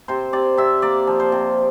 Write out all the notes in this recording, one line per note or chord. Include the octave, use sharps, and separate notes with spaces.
C3 C5
C3 D5
C3 E5
A#3 D5
F3
C5
C3